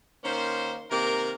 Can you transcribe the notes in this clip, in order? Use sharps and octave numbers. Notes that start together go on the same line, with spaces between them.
D#3 A#3 C#4 C5
C3 D#3 A#3 A#4